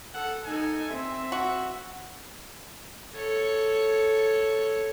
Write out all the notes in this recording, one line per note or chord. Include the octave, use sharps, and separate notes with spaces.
A4 F#5
D#4 A4 G#5
C4 E5
F#4
A4 C#5